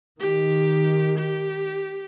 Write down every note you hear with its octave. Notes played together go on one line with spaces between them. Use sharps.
D#3 G4
G4